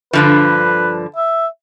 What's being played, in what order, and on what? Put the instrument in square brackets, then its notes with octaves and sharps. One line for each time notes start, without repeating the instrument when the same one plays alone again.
[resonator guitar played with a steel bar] G2 D3 F3 [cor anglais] B4
[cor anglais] E5